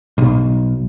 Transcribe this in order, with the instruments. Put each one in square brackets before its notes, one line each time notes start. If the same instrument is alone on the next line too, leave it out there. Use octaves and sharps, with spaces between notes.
[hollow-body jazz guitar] B1